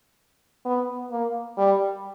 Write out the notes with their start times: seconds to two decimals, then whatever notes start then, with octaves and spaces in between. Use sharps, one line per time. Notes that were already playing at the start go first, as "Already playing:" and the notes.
0.65 B3
1.11 A#3
1.57 G3